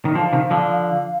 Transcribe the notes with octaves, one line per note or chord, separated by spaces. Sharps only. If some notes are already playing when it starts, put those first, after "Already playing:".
D#3
D3 F3 F5
C3 D#3
D3 F3